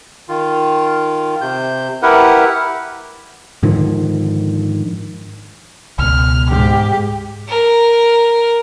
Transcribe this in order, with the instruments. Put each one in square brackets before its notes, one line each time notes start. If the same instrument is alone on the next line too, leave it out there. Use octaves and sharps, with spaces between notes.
[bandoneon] D#3 F4
C3 G6
E4 G4 A#4 B4 F#5
[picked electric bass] G#2 D3 D#3 F3
[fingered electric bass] C#2 B2 [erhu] F6
[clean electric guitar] D2 G#2 [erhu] G4
[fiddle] A#4